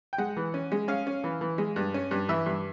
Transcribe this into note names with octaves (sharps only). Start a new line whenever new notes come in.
G5
G#3 F#5
E3
C#4
G#3
C#4 F5
C#4
E3
E3
G#3
G2
C#4
G2
E3 E5
G2